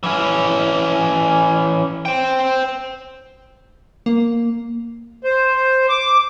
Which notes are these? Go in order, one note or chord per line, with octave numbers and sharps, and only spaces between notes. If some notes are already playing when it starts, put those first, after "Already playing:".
E3 C#4
C5 G5
A#3
C5
D6